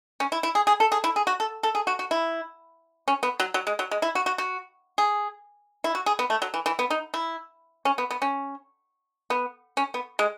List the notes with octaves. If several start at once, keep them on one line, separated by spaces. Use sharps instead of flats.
C#4
E4
E4
G#4
G#4
A4
G#4
E4
G#4
F#4
A4
A4
G#4
F#4
F#4
E4
C#4
B3
F#3
F#3
G#3
F#3
G#3
E4
F#4
F#4
F#4
G#4
E4
F#4
G#4
B3
A3
F#3
E3
E3
B3
D#4
E4
C#4
B3
B3
C#4
B3
C#4
B3
G#3